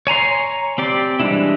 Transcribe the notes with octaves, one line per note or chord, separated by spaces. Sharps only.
C#5 G#5 A#5 C6
C4 G4 D5
E3 G3 G#3 D4 E4